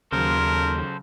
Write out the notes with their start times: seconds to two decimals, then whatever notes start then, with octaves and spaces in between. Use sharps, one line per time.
0.12 D#2 C#3 F#3 A4 A#4 C5